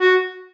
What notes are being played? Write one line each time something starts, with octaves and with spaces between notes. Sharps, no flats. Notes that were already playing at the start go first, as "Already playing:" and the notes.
F#4